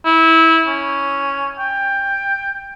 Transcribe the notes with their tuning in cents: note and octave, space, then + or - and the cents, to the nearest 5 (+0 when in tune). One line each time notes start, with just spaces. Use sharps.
E4 -20
C#4 +5
G5 +15